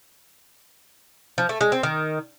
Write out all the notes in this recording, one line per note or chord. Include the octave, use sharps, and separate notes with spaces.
F3
A3
G#3
C4
D#3